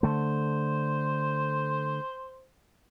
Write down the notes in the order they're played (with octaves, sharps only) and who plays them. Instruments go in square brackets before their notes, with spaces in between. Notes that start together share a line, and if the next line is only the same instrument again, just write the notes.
[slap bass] D3 A3 [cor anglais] C5